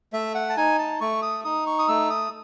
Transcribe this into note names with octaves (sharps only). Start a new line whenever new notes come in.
A3 E5
F#5
A5
D#4 G#5
A5
A3 C#6
D#6
D#4 D#6
C#6
D#6
A3 E6
D#6